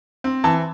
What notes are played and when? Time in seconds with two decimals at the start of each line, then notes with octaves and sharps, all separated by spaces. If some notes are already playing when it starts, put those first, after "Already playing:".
0.24 C4
0.44 E3 A5